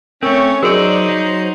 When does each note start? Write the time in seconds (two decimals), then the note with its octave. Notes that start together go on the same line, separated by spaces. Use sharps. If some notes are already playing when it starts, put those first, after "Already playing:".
0.23 A3 C4 C#4 A#4 C#5
0.63 F#3 D#4 F#4 G#4 A#4 C5 D5
1.09 F#3